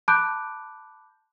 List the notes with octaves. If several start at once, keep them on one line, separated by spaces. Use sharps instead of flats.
A5 B5 D6 F#6 G6 D7